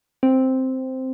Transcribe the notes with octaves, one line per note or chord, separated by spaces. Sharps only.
C4